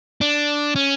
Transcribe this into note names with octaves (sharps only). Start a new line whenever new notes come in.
D4
C#4